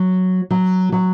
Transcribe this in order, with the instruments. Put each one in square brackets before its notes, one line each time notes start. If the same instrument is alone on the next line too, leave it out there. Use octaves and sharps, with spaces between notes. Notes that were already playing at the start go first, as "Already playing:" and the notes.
Already playing: [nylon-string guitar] F#3
F#3
F#3